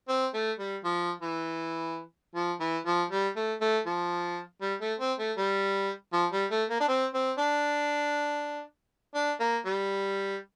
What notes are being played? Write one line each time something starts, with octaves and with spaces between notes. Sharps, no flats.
C4
A3
G3
F3
E3
F3
E3
F3
G3
A3
A3
F3
G3
A3
C4
A3
G3
F3
G3
A3
A#3
D4
C4
C4
D4
D4
A#3
G3